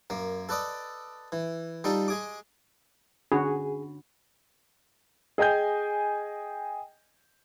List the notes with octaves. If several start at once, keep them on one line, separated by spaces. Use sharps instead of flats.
F#2 A#3
A4 B4 D5 D#5
E3
G3 D#4 F4 A4
G#3 G#4 D6
D3 C#4 D4 F#4 G#4 B5
G#4 D#5 G5 G#5 G6